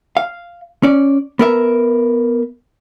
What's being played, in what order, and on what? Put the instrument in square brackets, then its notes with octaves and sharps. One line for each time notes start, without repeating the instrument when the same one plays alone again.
[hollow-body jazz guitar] F5
C#4 D5
B3 A#4 E5